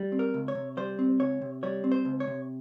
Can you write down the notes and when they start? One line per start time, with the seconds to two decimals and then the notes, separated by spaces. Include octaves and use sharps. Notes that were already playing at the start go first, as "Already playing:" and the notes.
Already playing: G3
0.12 C4
0.19 A#4
0.34 C#2
0.48 C#5
0.55 C3
0.77 G3 C5
0.99 C4
1.20 C#2 C#5
1.41 C3
1.63 G3 C#5
1.84 C4
1.92 C5
2.05 C#2
2.20 C#5
2.27 C3